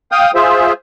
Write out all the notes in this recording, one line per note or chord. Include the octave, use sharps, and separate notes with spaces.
F5 G5 D#6
F4 G#4 C5 E5